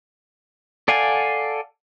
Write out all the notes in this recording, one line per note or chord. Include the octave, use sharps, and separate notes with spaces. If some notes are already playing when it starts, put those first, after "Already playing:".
A4 D5 F5 F#5 G#5